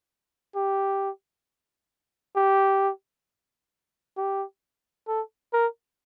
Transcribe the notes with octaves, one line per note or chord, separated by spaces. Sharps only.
G4
G4
G4
A4
A#4